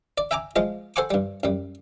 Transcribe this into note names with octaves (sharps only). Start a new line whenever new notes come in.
D5
E5 G5 G#5 A#5 D6
F3 G#3 F4 D#5
A4 C5 F#5 G#5 C#6 D6
G2 G3
F#2 G3